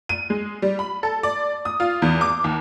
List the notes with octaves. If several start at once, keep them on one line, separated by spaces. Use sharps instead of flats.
D#7
G#3
G3
B5
A4
D5
D#6
F4
E2
D6
D#2